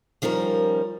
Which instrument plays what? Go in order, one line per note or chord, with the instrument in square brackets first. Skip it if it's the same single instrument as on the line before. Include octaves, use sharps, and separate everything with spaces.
[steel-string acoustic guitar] D#3 F3 G3 C#4 A#4